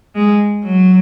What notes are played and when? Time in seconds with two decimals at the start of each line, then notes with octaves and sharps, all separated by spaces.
0.15 G#3
0.64 F#3